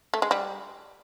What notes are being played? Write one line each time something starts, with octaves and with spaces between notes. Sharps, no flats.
A3
G#3
G3